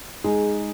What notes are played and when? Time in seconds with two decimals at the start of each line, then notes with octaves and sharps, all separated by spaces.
0.24 G#3 D#4 G#4